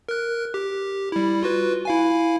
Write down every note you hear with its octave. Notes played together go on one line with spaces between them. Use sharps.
A#4 F#6
G4
G3 E4
F4 F#4 B4
E4 F5 G#5